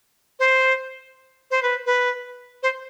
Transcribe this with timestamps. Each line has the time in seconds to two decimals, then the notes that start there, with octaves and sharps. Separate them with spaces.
0.39 C5
1.51 C5
1.63 B4
1.86 B4
2.63 C5